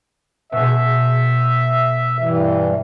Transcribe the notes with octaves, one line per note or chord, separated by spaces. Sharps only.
B2 G#4 E5
G2 E3